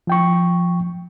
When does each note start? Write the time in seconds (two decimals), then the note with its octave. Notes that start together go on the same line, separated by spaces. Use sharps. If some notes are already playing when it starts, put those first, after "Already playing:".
0.07 F3 G5 C#6